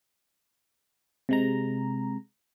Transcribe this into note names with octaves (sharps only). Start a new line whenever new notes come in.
C3 G#3 A#5